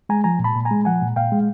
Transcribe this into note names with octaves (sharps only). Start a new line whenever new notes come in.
G#3 G#5 A#5
F3 G#5 A#5
A#2
A5 B5
A#2
G#5 A#5
G#3
F3 F#5 G#5
A#2
A#2 F5 G5
G#3